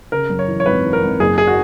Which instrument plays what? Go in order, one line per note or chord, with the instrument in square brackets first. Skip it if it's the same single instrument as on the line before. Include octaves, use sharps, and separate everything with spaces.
[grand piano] C#3 [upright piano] A#4
[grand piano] F#2
[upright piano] C#5
[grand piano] E3
[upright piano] C#5
[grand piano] G#1 [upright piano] B4
[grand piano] E3
[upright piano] A#4
[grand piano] G#1
[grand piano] F#1 [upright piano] G#4
[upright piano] G#4
F#4